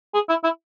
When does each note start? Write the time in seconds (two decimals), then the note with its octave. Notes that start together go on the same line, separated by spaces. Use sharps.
0.14 G#4
0.29 E4
0.44 E4